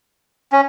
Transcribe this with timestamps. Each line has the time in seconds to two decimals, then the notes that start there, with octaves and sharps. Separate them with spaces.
0.52 C#4